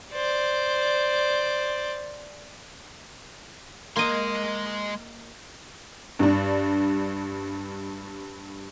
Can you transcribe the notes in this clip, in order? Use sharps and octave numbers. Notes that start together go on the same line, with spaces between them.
C5 D5
G#3 A#3 D#5 C6
G2 D4